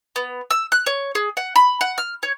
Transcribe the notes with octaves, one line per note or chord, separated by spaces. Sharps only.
B3
E6
F#6
C#5
G#4
F#5
B5
F#5
F6
C#5